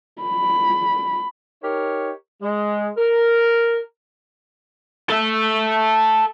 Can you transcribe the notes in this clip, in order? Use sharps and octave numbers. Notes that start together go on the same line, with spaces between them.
B5
D#4 G4 A#4 C#5
G#3
A#4
A4 E5